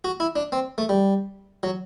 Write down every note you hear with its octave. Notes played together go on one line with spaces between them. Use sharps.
F#4
E4
D4
C4
A3
G3
F#3